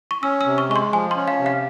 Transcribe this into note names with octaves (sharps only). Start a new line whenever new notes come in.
C#6
C#4 E6
E6
C3
C#6
G#3 C#6
C6
F3 G#5
C6
C#4
F5
C3
F5